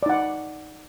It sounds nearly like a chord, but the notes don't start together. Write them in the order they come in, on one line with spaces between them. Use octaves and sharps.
D5 D#4 F#5